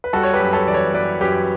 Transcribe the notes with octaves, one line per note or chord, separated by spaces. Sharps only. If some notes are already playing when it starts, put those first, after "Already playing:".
B4
G3 F#4 A4
C#5
G4 B4
F#2
A4 C#5
E3 D5
A4 C#5
F#2 B4 D5
F#2 G4 B4